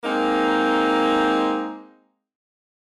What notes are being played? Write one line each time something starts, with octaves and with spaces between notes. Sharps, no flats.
G#3 A#3 C4 D#4